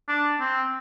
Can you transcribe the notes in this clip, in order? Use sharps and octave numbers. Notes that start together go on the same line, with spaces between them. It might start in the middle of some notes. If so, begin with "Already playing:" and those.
D4
C4